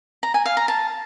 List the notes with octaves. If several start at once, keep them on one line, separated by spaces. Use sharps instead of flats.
A#5
G#5
F5
A#5
A5